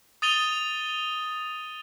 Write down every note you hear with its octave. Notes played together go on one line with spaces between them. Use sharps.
D#6 A6 D#7 F7 G7